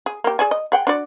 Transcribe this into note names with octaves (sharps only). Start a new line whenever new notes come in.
G#4
A#3 G4
G#4 D5 G#5
D#5
G#4 F#5 G5
D4 F#4 D5